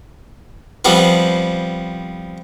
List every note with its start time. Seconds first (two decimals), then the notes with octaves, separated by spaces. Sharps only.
0.85 F3 G3 B3 C4 F4